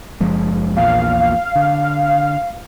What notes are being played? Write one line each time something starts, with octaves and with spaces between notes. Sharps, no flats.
F#1 F3 G#3
A#1 E2 A#2 F5
D3